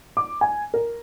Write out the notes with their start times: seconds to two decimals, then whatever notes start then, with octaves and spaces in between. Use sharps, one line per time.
0.17 D6
0.41 G#5
0.74 A#4